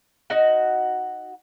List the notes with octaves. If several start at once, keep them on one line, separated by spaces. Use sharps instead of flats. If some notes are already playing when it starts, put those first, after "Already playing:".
D#4 F#4 F#5